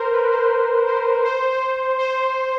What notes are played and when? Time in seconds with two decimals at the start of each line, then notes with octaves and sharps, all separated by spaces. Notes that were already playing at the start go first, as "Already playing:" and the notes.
Already playing: A#4 C5
0.12 B4
0.31 C5
0.87 C5
1.25 C5
1.50 C5
1.99 C5